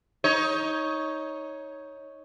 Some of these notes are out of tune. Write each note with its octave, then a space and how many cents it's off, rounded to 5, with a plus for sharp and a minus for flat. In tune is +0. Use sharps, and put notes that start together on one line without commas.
D#4 +15 C#5 +0